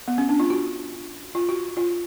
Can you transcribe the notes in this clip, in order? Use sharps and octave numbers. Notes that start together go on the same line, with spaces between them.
B3
C#4
D4
F4
F#4
F4
F#4
F4